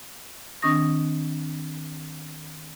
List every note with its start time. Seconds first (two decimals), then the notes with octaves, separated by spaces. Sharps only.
0.62 D#3 C4 D4 C#6 D#6 A#6